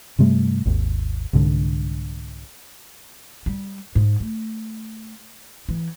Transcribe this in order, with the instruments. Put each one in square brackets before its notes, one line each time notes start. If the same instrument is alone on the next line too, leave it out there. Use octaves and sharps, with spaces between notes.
[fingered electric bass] G2 C3 G3 A3
G#1 D#2
C2 G#2 D3
[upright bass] G3
G#2
A3
E3